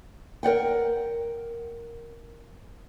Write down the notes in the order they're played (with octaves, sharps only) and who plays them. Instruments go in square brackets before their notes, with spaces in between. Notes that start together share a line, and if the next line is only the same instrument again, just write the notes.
[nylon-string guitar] A#4 D5 F#5 G5